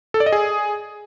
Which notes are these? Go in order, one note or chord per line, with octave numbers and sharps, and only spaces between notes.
A4
D5
D#5
G#4